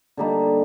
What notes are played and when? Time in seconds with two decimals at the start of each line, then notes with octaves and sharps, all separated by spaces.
0.17 D3 G3 A#3 D#4